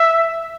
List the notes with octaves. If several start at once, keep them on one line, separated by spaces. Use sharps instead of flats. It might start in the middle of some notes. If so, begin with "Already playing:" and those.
Already playing: E5